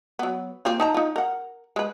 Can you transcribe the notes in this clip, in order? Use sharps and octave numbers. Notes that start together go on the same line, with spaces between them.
F#3 B3
A#3 C4 F4
D#4 A5 A#5
D#4 F4
A#4 F#5
G#3 B4